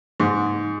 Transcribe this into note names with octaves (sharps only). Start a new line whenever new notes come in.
G#2